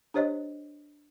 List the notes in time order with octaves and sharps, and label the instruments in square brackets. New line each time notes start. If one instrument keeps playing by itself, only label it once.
[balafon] D4 G4 C5 C#5 D#5